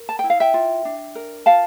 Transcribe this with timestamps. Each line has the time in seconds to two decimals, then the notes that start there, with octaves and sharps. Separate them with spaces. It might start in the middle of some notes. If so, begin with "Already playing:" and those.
Already playing: A#4
0.09 A5
0.19 E4 G5
0.30 F5
0.40 E5 G5
0.54 F4
0.85 D4
1.15 A#4
1.46 F4 F5 A5